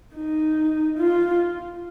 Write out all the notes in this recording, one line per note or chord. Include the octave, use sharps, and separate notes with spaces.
D#4
F4